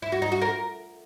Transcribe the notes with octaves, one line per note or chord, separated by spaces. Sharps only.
E4
F#4
D#4
F#4
A#4